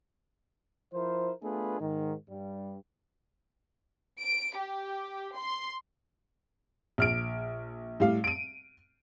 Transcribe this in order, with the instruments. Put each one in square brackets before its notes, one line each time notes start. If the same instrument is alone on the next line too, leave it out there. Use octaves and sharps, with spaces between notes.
[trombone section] F3 E4 A#4 C5
A3 B3 D4 F4 G#4 B4
G#2 D#3
G2 G3
[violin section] D7
G4
C6
[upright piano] A#1 F6 D7
A2 G3 F5
D7 D#7